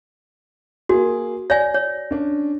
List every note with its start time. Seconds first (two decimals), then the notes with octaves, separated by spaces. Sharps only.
0.89 A#3 F#4 G#4
1.50 C#5 D5 G#5 A#6
1.74 C#5
2.11 C#4 D4